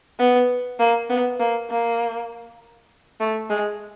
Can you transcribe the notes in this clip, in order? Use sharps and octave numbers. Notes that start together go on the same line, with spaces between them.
B3
A#3
B3
A#3
A#3
A3
G#3